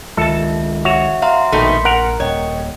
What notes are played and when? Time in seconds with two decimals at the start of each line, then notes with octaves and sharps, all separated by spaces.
0.17 C#2 D#3 G#3 F4 A4 E5 A5
0.85 F#4 C#5 E5
1.22 E5 F5 A#5 C6
1.52 A#1 B2 D#3 A3 C6 B6 C#7
1.85 A#4 F#5
2.20 D#1 C#5 D#5 G5